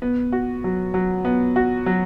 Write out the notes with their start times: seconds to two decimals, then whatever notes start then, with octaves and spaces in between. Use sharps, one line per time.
0.02 B3
0.32 F#4
0.64 F#3
0.94 F#3
1.25 B3
1.56 F#4
1.86 F#3